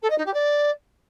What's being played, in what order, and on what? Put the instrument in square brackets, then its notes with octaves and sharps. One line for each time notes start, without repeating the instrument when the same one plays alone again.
[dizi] A4
D#5
D#4
G4
D5